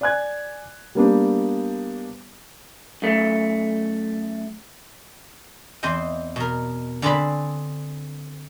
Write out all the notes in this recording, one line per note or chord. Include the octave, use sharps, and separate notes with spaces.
D5 G#5 F#6 G#6
G3 A#3 B3 D4 G4
F#2 A3
E2 C4 C5 D#5 G5
B2 A#4
D3 C4 G#4 B4 D5 B5